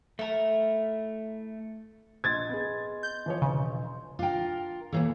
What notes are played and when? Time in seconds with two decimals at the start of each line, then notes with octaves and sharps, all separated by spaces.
0.19 A3 E4 A#4
2.24 A#1 D#5 C6 G#6 A6
2.49 B3 G#4
3.03 G6
3.26 E3 F3 C#5
3.42 E1 C#3
4.19 D4 F4 A#4 G5
4.92 E2 A#2 E3 A4 C#5 F5